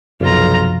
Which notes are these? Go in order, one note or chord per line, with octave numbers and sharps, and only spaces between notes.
B1 F#2 C3 F3 F4 A#5